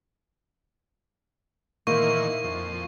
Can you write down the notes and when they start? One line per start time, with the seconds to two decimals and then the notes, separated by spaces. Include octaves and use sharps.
1.87 A#2 D#3 E3 A#3 C5 C#6
2.44 F2